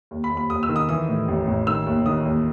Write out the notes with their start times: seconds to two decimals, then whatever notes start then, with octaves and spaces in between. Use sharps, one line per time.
0.11 D#2
0.24 B5
0.31 D#2
0.37 B5
0.50 D#2 D#6
0.63 E6
0.69 D#3
0.76 D#6
0.89 E3 D#6
1.08 A2
1.28 A1
1.47 A1
1.67 D#3 E6
1.87 D#2
2.06 D#3 D#6
2.25 D#2